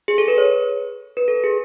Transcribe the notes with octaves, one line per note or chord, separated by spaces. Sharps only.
G#4
A4
B4
C#5
B4
A4
G#4